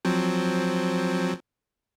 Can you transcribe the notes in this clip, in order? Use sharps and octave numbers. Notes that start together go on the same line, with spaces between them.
F3 F#3 C4